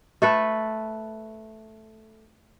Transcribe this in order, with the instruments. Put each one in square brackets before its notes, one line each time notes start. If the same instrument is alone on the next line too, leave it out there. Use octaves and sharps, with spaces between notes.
[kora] A3 A4 B4